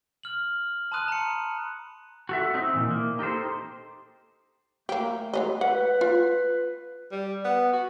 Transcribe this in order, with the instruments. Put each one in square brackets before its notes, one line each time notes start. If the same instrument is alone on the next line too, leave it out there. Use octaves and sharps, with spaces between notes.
[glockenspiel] F6 F#7
A5 B5 C6 D#6 F#6 D#7
A#5 C#7
[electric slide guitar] F#4 A4 E5
C4 D#4
A#2 E3
A#3
D#4 G4 A4 C5
[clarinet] A3 [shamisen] A#3 G4
[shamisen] G#3 B3 D#5
[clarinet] B4 [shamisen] F#5
[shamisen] F4
[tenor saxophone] G3
B3
F#4